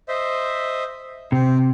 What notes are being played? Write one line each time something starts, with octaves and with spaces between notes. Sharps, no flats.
C5 D#5 E5
C3 C4